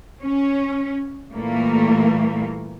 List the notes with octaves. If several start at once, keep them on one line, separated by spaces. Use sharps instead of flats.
C#4
A#2 E3 G3 A3 A#3